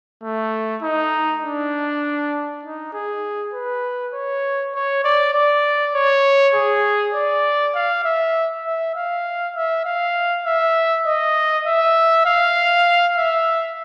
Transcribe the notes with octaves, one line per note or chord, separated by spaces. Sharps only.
A3
D#4
D4
D#4
G#4
B4
C#5
C#5
D5
D5
C#5
G#4
D5
F5
E5
E5
F5
E5
F5
E5
D#5
E5
F5
E5